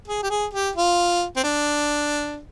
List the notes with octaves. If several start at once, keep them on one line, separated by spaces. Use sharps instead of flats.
G#4
G4
G#4
G4
F4
C4
D4